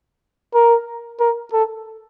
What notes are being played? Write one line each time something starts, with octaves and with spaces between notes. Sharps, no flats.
A#4
A#4
A4